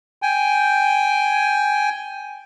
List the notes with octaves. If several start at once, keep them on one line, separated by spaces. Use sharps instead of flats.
G5 G#5